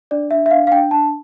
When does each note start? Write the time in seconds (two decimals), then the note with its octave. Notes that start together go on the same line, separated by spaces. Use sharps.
0.11 D4 D5
0.31 D4 E5
0.46 E5
0.51 D4 F5
0.67 F5
0.72 D4 G5
0.91 D4 A5